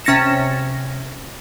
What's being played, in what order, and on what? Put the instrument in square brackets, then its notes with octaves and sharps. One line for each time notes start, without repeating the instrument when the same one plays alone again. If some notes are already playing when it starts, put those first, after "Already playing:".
[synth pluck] C3 C#4 A6 A#6 C#7 E7